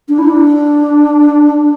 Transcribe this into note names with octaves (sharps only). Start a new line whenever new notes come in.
D4
E4
D4